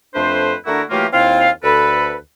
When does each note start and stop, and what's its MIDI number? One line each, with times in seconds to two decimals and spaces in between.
0.15 0.54 41
0.15 0.54 57
0.15 0.54 62
0.15 0.54 71
0.15 0.54 72
0.66 0.82 50
0.66 0.82 57
0.66 0.82 62
0.66 0.82 64
0.66 0.82 66
0.66 0.82 70
0.90 1.06 52
0.90 1.06 54
0.90 1.06 57
0.90 1.06 58
0.90 1.06 65
0.90 1.06 67
1.13 1.49 39
1.13 1.49 60
1.13 1.49 64
1.13 1.49 65
1.13 1.49 77
1.63 2.16 38
1.63 2.16 69
1.63 2.16 71